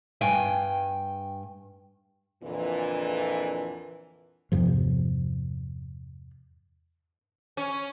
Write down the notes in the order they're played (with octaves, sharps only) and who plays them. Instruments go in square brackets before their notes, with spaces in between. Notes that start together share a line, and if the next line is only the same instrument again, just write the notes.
[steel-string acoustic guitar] G2 G5 G#5
[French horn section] F2 A#2 D3 E3
[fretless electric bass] E2 G2 C3 F3
[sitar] C#4